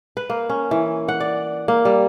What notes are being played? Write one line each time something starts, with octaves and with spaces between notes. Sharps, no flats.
B4
A#3
C#4
E3
F#5
D5
A#3
G3